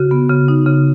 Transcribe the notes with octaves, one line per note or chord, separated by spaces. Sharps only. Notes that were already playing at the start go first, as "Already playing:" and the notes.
Already playing: C#3 F#4
B3
C#3
D#4
C#3